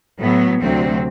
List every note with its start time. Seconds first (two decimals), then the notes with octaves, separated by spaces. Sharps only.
0.19 A2 F#3 B3
0.60 D2 C3 F#3 C4